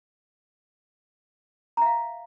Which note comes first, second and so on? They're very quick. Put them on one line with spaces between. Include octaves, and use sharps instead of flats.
A#5 E5 F5